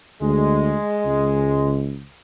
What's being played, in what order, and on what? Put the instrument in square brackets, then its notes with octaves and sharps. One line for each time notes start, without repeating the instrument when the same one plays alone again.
[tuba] D2 [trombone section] G#3
[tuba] C#2